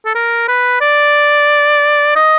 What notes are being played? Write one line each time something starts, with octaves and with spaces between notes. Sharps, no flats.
A4
A#4
B4
D5
D#5